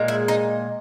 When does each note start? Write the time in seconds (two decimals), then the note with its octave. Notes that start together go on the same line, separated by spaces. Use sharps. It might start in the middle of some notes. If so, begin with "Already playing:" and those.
Already playing: A#2 G#3
0.08 E4
0.28 D#4